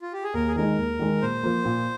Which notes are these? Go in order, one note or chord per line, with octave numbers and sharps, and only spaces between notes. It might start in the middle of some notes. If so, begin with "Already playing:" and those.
F4
G4
G#4
D#2 A#4
G#4
D#3 G#3 D#4 A#4
D#2
D#3 G#3 D#4
A#2 C5
F3 A#3
A#2